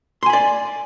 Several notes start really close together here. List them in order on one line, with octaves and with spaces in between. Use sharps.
C6 G#5 B5 D5